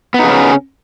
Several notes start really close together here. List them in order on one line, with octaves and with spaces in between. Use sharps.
B3 D#4 C#3 C#4